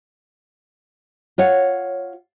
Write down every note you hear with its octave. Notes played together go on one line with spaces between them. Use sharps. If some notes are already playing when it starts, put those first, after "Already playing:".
F4 C#5 F#5